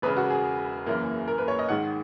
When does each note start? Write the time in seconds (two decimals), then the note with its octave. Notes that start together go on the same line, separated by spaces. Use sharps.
0.02 E1 E2 C#3 B4
0.17 F#4
0.30 G#4
0.86 F#1 F#2 E3 A#3
1.28 A#4
1.38 B4
1.48 C#5
1.59 D#5
1.69 G#1 G#2 D#3 F#5